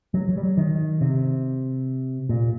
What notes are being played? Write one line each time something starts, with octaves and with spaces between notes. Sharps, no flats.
F#3
F#3
G3
F#3
D#3
C3
A#2